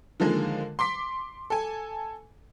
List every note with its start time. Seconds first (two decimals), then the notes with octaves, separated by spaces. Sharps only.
0.20 D3 D#3 F3 G#3 A#3
0.79 C6 D6 B6
1.50 A4 G#5